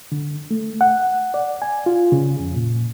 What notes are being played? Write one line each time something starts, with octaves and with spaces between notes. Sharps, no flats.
D3
A3
F#5
D5
G#5
F4
C#3
F2
A#2